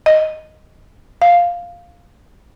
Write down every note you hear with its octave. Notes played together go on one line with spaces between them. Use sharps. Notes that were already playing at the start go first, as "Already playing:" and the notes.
D#5
F5